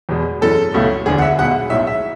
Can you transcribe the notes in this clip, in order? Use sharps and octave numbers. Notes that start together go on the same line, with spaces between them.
E2 B2 G#3
F#2 E3 G#3 A4
C#2 B2 F#3 A3
E1 D2 D3 G#4
F#5
E5
B1 B2 G#3 F#5
B1 A2 G#3 E5
E5